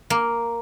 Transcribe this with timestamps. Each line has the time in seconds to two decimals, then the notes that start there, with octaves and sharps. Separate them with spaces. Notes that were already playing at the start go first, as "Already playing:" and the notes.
0.10 A#3